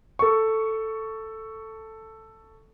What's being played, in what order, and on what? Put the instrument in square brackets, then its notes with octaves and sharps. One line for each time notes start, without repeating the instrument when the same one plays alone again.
[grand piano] A4 C#6